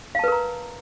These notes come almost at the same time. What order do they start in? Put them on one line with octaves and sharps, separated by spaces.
F5 A5 B4 A#4 A#5